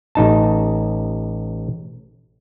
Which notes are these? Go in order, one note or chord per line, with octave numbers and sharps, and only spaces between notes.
A1 D#4 A5